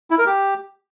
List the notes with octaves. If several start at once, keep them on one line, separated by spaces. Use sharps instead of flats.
E4
A#4
G4